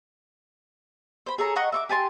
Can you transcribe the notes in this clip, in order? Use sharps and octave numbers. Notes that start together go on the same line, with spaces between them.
C5 B5
G#4 A4 C#5 A#5
D#5 F#5 A#5 C#6
E5 C#6 D6
G4 G#5 A5 C6